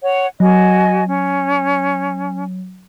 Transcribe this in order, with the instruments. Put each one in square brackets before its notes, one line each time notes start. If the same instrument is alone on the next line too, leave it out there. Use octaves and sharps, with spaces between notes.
[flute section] C#5 F#5
[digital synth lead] F#3 [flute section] F#4 D#5 G#5
[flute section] C#4